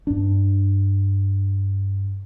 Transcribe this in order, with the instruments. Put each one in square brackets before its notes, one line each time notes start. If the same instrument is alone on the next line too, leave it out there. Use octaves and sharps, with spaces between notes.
[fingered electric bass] G2 D4